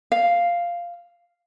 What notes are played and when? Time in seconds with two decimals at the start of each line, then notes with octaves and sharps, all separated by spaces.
0.12 F5